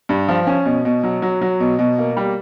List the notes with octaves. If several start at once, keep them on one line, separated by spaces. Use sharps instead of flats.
G2
F3
C#4
B2
B2
F#3
F#3
F#3
B2
B2
A#3
G3